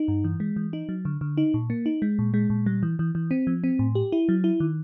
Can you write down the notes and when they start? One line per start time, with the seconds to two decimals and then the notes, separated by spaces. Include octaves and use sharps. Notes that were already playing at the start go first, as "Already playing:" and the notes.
Already playing: D#4
0.08 G2
0.24 E3
0.40 G#3
0.56 E3
0.73 D#4
0.89 F#3
1.05 D3
1.21 D3
1.38 D#4
1.54 A#2
1.70 A#3
1.86 D#4
2.02 G#3
2.19 A#2
2.34 G#3
2.50 A#2
2.66 G3
2.83 E3
2.99 E3
3.15 E3
3.31 C4
3.47 F3
3.64 C4
3.79 A2
3.95 G4
4.12 E4
4.29 F#3
4.44 E4
4.60 D#3